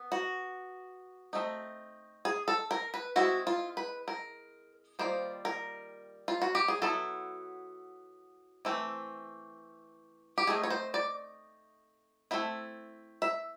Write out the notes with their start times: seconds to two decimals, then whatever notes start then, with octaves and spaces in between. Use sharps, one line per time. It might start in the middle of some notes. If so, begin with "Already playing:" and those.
Already playing: B3
0.12 F#4
1.33 A3 C4 D#4
2.25 G#4
2.48 A4
2.71 A#4
2.94 B4
3.16 G#3 C4 E4 F#4
3.47 F4
3.77 B4
4.08 A#4
4.99 D#3 G3 A#3 F4 C5
5.45 A#4
6.28 F4
6.42 F#4
6.55 G4
6.68 G#4
6.82 F#3 B3 E4 A4
8.65 E3 A3 C4
10.38 G4
10.47 A3 C4 D#4 G#4
10.63 C#5
10.70 C5
10.94 D5
12.31 A3 C4 E4
13.22 E5